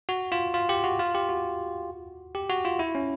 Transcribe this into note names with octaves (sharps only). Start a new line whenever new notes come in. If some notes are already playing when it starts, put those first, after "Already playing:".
F#4
F4
F4
G4
F#4
F4
G4
F#4
G4
F#4
F4
E4
C#4